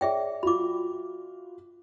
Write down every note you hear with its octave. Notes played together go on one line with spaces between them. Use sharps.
G#4 C#5 D5 E5 G5
F4 F#4 B5 D6